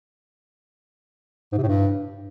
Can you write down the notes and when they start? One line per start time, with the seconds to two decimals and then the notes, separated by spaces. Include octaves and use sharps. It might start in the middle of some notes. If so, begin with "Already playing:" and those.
1.52 G#2
1.58 C3
1.63 A2
1.68 G2